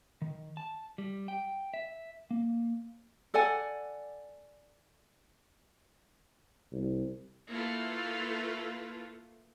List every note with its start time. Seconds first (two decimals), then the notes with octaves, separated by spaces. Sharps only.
0.22 D#3
0.57 A5
0.98 G3
1.28 G5
1.74 E5
2.31 A#3
3.34 A4 D5 F#5 G#5
6.73 C2
7.50 A3 A#3 E4 F4 A4 B4